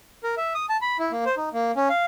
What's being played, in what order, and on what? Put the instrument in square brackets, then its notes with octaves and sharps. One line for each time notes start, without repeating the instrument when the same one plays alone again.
[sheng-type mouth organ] A#4
E5
D#6
A5
B5
E4
A#3
C5
D#4
A#3
C#4
F5